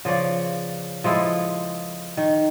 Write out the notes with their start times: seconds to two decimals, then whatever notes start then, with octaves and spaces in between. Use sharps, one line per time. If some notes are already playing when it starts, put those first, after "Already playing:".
0.05 C#3 F3 C#5 D5
1.04 F3 G#3 E4 A4
2.17 D#3